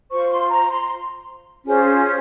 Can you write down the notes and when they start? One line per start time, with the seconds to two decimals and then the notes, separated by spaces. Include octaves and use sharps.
0.11 F4 C5 C#6
0.30 C6
0.50 A#5
0.69 C6
1.64 C#4 F4 G#4 C5